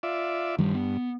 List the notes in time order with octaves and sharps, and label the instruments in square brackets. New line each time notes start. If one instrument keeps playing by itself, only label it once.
[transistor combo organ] F4 D5 E5
[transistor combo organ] G2 [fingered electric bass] D#3 G3
[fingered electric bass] B3